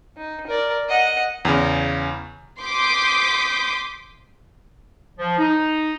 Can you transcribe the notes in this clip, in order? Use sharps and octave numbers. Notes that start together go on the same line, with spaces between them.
D#4
A#4 D5
D#5 F#5
E2 C#3
C6 D6 D#6 G6 B6
F3
D#4